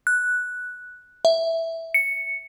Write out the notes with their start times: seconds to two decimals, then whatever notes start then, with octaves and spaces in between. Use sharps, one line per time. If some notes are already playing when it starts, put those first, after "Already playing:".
0.07 F#6
1.25 E5
1.94 C#7